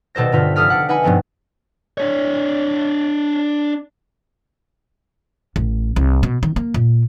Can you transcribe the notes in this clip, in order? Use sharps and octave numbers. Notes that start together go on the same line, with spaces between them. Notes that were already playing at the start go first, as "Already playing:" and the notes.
D#1 B2 A4 C5 A#6
G2 D3 B3 F4 C5 B6
F1 A4 D#6 F6 B6
D4 F#5
D#4 B4 F#5 G#5 B5
G2 B2 F3 B3 C4
D4 C#5
A1
C2
B2
D#3
A#3
A#2